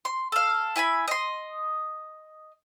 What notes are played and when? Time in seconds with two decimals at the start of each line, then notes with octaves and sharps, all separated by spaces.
0.05 C6
0.32 A4 F5
0.76 E4 G#5 A5 B5
1.08 D#5 C6